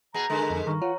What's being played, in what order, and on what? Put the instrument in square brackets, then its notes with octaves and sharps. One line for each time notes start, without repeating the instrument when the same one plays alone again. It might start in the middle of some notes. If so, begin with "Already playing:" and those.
[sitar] B2 B3 G#4 [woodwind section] A#5
[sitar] B2 D3 G#3 [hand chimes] A4 A#4
[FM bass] F2
[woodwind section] G2 G3 [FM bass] D#3 [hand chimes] A#5 C#6 F6
[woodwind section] E3 F#5 [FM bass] F4 [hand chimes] C#5 A#5